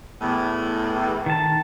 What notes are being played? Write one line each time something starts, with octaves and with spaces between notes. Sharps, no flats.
E2 A2
D#3 A5